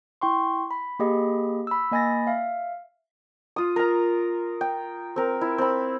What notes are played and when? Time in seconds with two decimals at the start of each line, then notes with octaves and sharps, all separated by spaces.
0.21 E4 G5 C6 C#6
0.71 B5
0.99 A#3 G4 G#4 D#5 B5
1.67 B5 E6
1.92 A#3 D#5 G#5 B5 A6 A#6
2.27 E5 F5
3.56 F4 D#6
3.76 A#4 A#5
4.61 G5
5.16 C4 A#4
5.41 E4
5.58 C4 B5